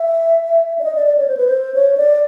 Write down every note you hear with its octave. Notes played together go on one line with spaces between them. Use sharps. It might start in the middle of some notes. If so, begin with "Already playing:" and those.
Already playing: E5
D5
D#5
D5
D5
C#5
C5
B4
C5
C#5
D5